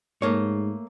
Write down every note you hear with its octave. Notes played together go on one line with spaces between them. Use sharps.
G#2 A3 A#3 C#5